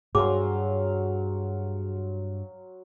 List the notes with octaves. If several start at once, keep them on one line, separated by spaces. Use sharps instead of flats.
G2 F#3 G#4 F5 C6 D6